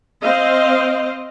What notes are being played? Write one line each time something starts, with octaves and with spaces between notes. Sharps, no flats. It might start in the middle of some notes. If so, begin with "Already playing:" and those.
C4 C5 D#5 F5